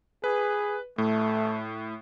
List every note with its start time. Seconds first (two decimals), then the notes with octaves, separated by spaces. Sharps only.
0.24 G#4 B4
0.98 A2 A3